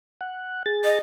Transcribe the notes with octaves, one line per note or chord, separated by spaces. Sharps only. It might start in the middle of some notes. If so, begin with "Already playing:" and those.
F#5
G#4 A6
D#5